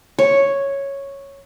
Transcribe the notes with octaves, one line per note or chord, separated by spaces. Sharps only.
C#5